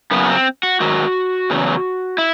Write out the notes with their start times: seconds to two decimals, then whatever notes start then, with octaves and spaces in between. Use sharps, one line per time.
0.11 F#2 C#3 F#3 B3
0.24 C#4
0.29 C4
0.63 F#4
0.80 G#2 D#3 F#3 F#4
1.50 E2 C#3 F#3
2.18 E4